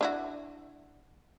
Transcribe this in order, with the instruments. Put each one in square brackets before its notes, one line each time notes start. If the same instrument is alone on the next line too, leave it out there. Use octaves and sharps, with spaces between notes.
[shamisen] D4 E4 F#4